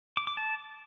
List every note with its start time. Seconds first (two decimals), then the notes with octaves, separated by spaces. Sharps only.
0.17 D6
0.27 D6
0.37 A5